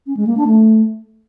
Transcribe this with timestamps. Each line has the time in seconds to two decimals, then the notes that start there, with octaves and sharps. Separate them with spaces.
0.06 C#4
0.17 G#3
0.27 A#3
0.37 D4
0.47 A3